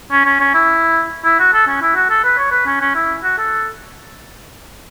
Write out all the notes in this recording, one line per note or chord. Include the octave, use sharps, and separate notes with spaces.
C#4
C#4
C#4
E4
E4
F#4
A4
C#4
E4
F#4
A4
B4
C#5
B4
C#4
C#4
E4
F#4
A4